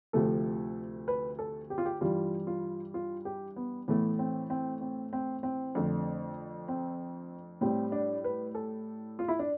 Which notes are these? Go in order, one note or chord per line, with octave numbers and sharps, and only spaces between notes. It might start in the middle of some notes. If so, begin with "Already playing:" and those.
D2 C3 F3 A3 A4
B4
A4
G4
F4
G4
G2 E3 G3 F4
F4
F4
G4
B3
A2 E3 A3 B3
C4
C4
C4
C4
C4
F2 D3 A3
C4
A2 G3 C4
D4
B4
A4
F4
E4
D4